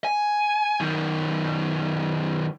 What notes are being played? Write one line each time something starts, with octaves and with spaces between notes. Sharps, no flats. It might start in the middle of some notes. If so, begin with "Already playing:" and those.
G#5
F#2 D#3